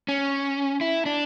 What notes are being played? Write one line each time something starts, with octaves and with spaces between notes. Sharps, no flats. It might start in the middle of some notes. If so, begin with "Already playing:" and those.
C#4
E4
D4